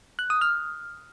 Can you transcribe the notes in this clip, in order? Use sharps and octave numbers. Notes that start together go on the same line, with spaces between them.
F#6
D#6
F6